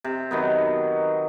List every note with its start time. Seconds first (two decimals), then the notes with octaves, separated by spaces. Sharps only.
0.04 C3
0.31 D#3 F#3 B3